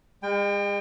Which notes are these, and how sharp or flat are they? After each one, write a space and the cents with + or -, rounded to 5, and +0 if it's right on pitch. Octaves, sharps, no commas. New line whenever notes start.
G#3 -40 G5 +30